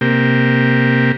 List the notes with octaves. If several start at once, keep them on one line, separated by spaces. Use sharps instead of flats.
C3 A#3 G4